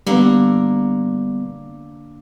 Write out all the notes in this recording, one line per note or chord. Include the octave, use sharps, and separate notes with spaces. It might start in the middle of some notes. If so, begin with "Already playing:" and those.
D3 G3 A#3 B3